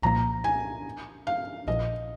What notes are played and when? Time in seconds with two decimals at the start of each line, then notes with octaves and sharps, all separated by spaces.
0.02 C2 A#2 F3 A#3 A#5
0.44 G#5
1.27 F5
1.67 A#1 A#2 F3 D#5